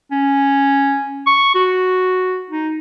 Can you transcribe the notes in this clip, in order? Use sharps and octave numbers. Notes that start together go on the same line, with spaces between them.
C#4
C#6
F#4
D#4